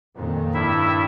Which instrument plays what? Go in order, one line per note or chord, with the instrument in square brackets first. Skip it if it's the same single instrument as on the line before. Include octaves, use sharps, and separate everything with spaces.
[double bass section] F2 A#2 D#3
[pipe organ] G2 E4 E5